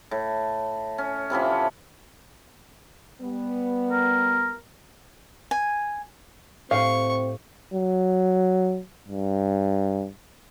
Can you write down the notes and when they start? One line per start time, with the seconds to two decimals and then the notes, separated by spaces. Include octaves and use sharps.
0.11 A2
0.98 C#4
1.30 C3 E3 F3 C#4
3.21 G3 B3
3.91 A#4
5.51 G#5
6.71 A2 C4 G4 F5 C#6 G6
7.74 F#3
9.08 G2